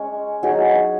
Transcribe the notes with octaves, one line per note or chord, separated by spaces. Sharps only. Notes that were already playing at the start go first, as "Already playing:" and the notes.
Already playing: G#3 C#4 C#5
F#3 D#4 G#4